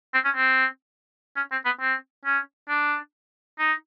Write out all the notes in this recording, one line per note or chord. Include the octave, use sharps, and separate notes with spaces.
C4
C#4
C4
C#4
C4
B3
C4
C#4
D4
D#4